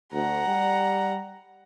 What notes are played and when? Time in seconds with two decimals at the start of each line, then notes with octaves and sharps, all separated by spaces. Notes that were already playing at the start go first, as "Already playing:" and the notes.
0.13 D2 F#5 A#5
0.45 G3